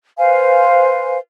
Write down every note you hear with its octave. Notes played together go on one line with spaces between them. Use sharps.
B4 C5 F5 G#5